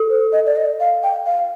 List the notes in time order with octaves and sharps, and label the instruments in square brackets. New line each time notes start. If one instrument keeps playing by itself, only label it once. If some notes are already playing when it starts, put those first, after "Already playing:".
Already playing: [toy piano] A4
[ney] C5
D#5
D5
D#5
F5
G5
F5